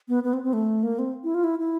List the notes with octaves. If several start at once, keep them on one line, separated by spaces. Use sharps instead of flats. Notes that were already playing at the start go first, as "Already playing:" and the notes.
B3
B3
C4
C4
A3
A#3
C4
E4
F4
E4
E4